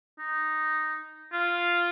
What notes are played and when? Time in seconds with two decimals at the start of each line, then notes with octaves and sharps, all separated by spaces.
0.19 D#4
1.33 F4